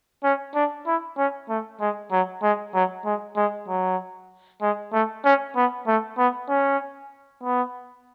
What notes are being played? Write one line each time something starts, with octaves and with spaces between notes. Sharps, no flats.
C#4
D4
E4
C#4
A3
G#3
F#3
G#3
F#3
G#3
G#3
F#3
G#3
A3
C#4
B3
A3
B3
C#4
B3